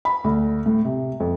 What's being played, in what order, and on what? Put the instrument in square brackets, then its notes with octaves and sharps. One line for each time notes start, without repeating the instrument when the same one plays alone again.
[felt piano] B5
D2
A2
C3
F2